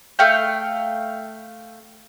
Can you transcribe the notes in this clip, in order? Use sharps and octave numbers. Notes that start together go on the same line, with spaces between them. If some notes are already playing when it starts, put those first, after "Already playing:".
A3 F5 G5